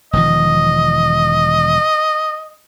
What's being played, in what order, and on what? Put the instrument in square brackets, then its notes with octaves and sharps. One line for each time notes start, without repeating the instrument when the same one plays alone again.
[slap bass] E1 D#3 F3 [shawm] D#5